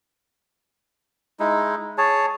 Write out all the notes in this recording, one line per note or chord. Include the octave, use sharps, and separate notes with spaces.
G#3 D#4 E4
G#4 C#5 A5